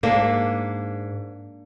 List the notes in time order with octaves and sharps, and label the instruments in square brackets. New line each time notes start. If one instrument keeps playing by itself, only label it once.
[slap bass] G#2 [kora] A#3 D4